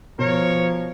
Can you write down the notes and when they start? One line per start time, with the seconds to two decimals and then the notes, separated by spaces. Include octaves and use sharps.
0.19 B2 F3 A#4 C#5